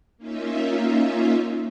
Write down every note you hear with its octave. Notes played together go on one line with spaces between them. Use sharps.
A#3 C#4 D#4 F4 E5